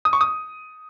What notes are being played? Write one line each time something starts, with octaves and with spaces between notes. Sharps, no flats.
D#6
C#6
D#6